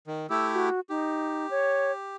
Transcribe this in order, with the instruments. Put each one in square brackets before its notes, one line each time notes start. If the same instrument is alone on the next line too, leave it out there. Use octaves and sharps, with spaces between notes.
[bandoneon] D#3
[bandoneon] A3 E4 G4 [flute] E6
[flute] F#4
[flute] D#4 [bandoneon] G4
[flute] C#5